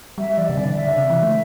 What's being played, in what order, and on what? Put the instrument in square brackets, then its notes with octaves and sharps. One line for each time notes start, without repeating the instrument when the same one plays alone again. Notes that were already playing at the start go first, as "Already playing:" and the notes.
[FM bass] G3 [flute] E5
[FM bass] E3 [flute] D5
[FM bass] C3
[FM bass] D3 [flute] D5
[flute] E5
[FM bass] D3
C3
E3
A3